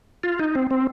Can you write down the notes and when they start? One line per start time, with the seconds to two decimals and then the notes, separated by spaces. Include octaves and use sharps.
0.23 F4
0.39 D#4
0.55 C4
0.71 C4